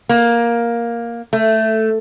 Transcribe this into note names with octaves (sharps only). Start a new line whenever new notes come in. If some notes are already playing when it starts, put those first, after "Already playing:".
A#3
A3